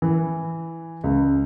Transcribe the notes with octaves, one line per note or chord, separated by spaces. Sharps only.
E3
C#2